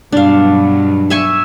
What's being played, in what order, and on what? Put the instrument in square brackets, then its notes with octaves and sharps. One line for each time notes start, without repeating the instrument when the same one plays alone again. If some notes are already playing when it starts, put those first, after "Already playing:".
[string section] G2 B2 F#3 [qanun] D4 F5
[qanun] E5 G#5 C#6